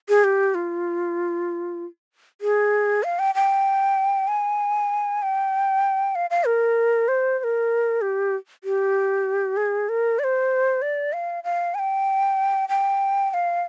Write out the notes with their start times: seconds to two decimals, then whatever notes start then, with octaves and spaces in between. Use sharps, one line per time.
0.09 G#4
0.24 G4
0.55 F4
2.41 G#4
3.04 F5
3.19 G5
3.35 G5
4.28 G#5
5.22 G5
6.15 F5
6.30 F5
6.46 A#4
7.08 C5
7.39 C5
7.44 A#4
8.01 G4
8.64 G4
9.57 G#4
9.89 A#4
10.19 D5
10.24 C5
10.82 D5
11.13 F5
11.44 F5
11.75 G#5
11.79 G5
12.69 G5
13.31 G5
13.34 F5